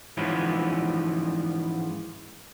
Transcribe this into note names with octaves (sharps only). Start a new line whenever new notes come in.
G#2 E3 F3 B3 C#4